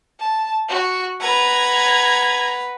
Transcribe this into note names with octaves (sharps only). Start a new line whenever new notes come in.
A5
F#4
B4 F#5 A#5 G#6